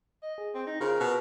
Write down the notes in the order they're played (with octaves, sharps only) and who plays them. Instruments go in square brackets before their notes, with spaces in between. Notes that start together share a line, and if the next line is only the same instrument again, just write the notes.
[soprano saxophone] D#5
[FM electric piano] G#4
[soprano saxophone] C4
D#4
[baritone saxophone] C#3 [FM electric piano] F4 G#4 C5 [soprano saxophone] A#4
[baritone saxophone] B2